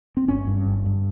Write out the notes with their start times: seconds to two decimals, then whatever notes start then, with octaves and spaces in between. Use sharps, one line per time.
0.17 C4
0.28 G1 C#4
0.47 G2
0.66 G1
0.86 G2